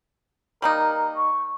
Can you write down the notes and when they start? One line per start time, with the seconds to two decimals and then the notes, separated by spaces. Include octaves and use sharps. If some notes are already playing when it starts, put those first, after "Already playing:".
0.62 G3 A#3 D#4 A#4
1.17 C#6